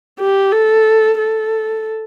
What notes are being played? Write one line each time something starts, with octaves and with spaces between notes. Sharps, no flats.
G4
A4
A4